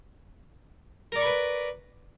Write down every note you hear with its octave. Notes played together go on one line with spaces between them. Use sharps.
A#4 B4 D5 B5 C#6